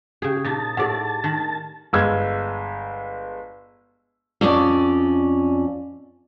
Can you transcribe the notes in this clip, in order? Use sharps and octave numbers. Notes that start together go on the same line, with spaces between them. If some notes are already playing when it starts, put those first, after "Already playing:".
C#3 G4 G#4
A#2 D#4 A5
A2 G4 G#4 D5 F#5
D#3
G1 G#3 E6 G#6
F2 C#4 G4 D5